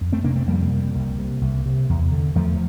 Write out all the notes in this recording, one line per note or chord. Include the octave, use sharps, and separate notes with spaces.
F2
A3 C4
C3 A#3 D4
A3 C4
F2 G3 A#3
C3
C2
C3
C2
C3
E2
D3
E2 F3 A3